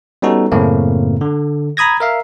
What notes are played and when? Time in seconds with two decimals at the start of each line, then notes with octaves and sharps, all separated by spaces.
0.22 G3 B3 C#4 D#4 F#4 A4
0.52 F#2 A2 C#3 A3 A#3 C4
1.21 D3
1.77 A#5 B5 D#6 G#6 A#6
2.00 A#4 E5 F5